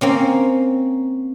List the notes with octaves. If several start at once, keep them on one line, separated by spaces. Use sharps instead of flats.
A#3 C4 C#4